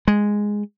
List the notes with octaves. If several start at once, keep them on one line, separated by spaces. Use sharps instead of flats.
G#3